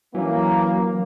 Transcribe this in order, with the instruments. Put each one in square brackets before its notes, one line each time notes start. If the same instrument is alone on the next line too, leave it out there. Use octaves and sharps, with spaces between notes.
[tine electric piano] E3 C#4 [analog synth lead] F#3 [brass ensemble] A#3